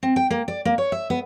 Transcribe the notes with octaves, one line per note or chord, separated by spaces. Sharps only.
C4
G5
A#3
D5
A#3
C#5
E5
B3